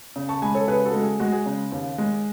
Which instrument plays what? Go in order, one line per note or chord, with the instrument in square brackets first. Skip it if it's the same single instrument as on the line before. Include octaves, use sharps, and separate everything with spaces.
[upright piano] C#3
A5 C#6
G#3 G#5 B5
A4 C#5
C#3 G#4 B4
F#4 A4
G#3
G#4
G#3 F#4
G#4
C#3
D#2
G#3